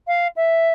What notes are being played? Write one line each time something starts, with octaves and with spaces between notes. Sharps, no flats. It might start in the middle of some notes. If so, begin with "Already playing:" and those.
F5
E5